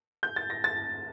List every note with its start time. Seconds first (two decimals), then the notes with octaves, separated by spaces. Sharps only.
0.23 G6
0.36 A6
0.50 A#6
0.64 A6